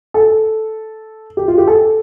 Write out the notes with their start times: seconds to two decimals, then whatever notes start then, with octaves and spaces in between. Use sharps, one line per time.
0.14 A4
1.37 G4
1.48 F4
1.58 G4
1.68 A4